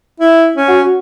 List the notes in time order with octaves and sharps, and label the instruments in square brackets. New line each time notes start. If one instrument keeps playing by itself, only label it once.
[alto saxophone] E4
C#4
[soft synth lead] F#4